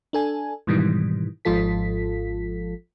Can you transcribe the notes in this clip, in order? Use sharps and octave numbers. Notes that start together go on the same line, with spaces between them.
D4 A4 G#5
G#2 B2 D#3 E3 G3
G#1 G#2 F3 F4 A4 B6